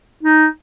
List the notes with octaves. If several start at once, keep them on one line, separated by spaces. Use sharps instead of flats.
D#4